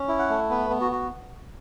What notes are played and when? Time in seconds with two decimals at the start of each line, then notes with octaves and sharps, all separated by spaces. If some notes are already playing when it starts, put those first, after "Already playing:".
Already playing: C#4
0.08 E4
0.19 F#5
0.29 A3
0.50 B3 B4
0.70 B3
0.81 F#4
0.91 F#4